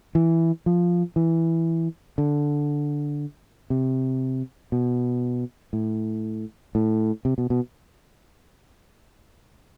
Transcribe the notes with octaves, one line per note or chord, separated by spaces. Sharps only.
E3
F3
E3
D3
C3
B2
A2
A2
C3
B2
B2